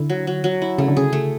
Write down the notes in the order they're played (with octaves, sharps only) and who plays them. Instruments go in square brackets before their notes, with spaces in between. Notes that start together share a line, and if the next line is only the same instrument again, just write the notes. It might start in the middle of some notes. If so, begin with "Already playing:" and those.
Already playing: [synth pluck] D3 [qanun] E4
[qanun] F#3
F#3
F#3
E4
[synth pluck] C#3 [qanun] A3
[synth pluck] D3
[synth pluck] C#3 [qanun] G#4
[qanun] A3